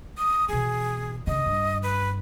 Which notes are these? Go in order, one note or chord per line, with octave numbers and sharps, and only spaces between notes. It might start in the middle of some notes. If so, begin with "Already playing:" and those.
D#6
B2 E3 G#4
C#3 D#5
G2
B4